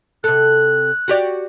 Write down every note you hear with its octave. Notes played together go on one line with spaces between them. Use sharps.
C3 A4 F#6
F#4 G4 D5